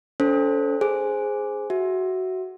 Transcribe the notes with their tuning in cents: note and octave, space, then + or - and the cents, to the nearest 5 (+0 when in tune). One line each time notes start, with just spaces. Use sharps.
C#4 +45 A4 +0 C5 +0
G#4 +0 C5 +0
F#4 +15 E5 +0